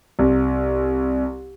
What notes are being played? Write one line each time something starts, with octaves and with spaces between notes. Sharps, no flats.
C2